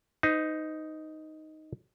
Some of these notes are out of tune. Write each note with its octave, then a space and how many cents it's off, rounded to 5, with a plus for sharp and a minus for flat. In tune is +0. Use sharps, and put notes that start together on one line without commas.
D#4 +0 C5 -45